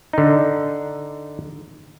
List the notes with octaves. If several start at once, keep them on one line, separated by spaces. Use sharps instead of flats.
D3 D#4